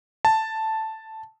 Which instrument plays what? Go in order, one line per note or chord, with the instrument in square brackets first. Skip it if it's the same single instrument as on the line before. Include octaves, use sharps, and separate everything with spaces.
[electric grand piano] A5